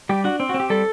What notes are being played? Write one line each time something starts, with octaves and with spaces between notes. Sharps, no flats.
G3 G4
D4 F#4
C4
F#4
C4
G4
G3 A4